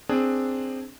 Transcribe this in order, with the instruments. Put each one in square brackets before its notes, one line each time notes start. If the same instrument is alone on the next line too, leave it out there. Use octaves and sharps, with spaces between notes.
[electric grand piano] C4 D4 G#4